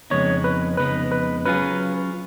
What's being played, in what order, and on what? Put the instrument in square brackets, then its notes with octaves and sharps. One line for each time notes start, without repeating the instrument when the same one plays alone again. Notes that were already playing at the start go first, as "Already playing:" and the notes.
[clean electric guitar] F2 C#3 G#3 B3 D#4 [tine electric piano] C#5
[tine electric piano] B4
[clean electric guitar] F2 C#3 G#3 B3 D#4 [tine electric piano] B4
[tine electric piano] B4
[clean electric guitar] F#3 C#4 F4 G#4 [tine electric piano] B4